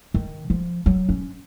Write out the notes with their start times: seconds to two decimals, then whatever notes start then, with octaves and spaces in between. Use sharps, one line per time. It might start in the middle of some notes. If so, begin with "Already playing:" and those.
0.14 D#3
0.50 F3
0.86 F#3
1.09 C#4